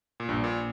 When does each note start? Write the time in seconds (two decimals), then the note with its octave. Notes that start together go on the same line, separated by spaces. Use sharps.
0.20 A#2
0.28 A#1 G2
0.44 A#2